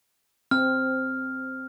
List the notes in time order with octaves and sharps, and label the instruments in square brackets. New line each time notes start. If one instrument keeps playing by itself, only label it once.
[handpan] C4 [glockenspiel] F6